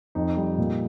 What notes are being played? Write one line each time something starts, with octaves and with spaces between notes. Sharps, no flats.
F2 D#4
G3
A#2